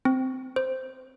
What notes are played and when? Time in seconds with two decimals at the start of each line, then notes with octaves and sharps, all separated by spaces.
0.05 C4
0.56 C5